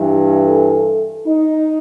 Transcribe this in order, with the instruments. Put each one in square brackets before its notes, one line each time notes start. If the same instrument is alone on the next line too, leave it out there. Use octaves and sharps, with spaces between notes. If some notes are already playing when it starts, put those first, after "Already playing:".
Already playing: [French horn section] G2 E3
A4
D#4